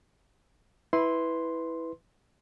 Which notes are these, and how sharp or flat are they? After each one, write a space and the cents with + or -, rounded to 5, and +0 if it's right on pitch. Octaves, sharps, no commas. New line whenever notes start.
E4 -10 B4 +5 C6 +0